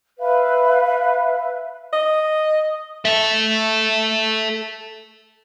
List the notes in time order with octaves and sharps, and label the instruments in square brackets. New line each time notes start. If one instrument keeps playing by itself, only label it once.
[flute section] B4 E5 F5
[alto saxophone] D#5
[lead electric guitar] A4 E5